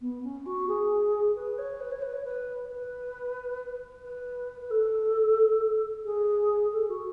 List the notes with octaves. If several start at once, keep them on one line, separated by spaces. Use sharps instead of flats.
B3
C#4
F#4
G#4
B4
C#5
B4
C#5
B4
C#5
B4
B4
B4
B4
A4
G#4
A4
F#4